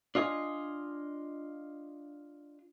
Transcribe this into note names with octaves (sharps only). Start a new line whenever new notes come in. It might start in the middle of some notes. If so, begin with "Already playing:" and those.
D4 F4 D#5 G#5